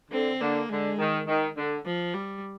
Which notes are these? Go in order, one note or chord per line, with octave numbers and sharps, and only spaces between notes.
D3 C4
D3 A#3
D3 G#3
D#3
D#3
D3
F3
G3